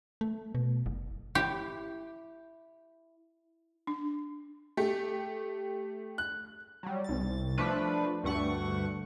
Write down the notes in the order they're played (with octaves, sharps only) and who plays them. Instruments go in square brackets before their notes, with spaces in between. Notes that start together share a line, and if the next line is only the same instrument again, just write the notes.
[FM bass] A3
B2
F#1
[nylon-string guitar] E4 [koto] G4
[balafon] D4
[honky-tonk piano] A3 G4
F#6
[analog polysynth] F#3 G3
C2 A6
F3 A3 D4 B4
D2 G2 A3 F#5 C#6